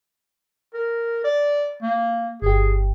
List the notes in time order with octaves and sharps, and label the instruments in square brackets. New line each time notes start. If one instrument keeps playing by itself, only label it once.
[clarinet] A#4
D5
A#3
[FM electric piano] G1 G4 [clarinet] G#4